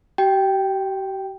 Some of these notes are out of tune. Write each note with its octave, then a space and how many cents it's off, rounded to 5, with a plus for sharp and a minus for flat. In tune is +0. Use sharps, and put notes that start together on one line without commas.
G4 -45 G5 +0